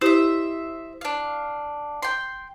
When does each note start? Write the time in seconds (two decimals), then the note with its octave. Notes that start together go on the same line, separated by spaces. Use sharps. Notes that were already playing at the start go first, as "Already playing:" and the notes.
0.01 E4 G4 C5 D#5 E5
1.01 D4 F5
2.03 G5 C6